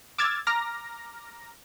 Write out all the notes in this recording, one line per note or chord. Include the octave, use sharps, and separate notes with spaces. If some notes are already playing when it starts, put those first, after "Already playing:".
D6 E6 F6 G#6 A6
A#5 D6 F6 A#6